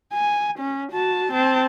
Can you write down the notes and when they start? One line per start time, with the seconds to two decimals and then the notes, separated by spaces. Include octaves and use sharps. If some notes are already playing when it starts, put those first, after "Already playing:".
0.13 G#5
0.59 C#4
0.93 F#4 A5
1.33 C4 A5